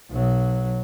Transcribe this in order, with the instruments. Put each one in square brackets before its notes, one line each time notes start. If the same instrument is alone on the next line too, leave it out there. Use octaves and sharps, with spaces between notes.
[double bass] B1 F#3